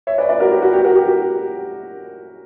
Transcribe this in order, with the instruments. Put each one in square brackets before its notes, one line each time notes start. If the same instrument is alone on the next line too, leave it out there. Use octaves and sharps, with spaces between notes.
[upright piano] C#5 E5
B4 D5
B4 D5
F#4 A#4
G4
F#4
G4
F#4 A#4
G4
G4